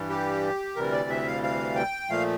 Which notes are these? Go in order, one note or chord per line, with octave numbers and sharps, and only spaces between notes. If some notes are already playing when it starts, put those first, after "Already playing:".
Already playing: G2 E3 G3
G4
D2 C3 E3 G3 A#4
D5
E5
F5
F5
G5
A#2 F3 A3 F5